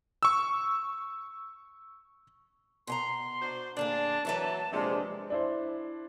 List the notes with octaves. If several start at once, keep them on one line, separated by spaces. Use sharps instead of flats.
C#6 E6
B2 G#5 A#5 C6
D4 F#4 C5
D2 A#2 D4 G#4 A5
E3 F#3 B4 E5 A#5
A#1 C3 G#3 D4
D4 E4 C5